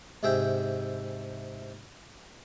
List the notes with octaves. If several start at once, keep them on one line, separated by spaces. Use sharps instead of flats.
G#2 C3 G#4 E5 G5